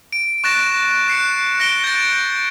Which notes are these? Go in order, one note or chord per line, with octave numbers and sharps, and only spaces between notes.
D7
C#6 F#6 A6 A#6 E7
F#6 C7 C#7
F#6 A#6 C#7 D7 G7
G6 A6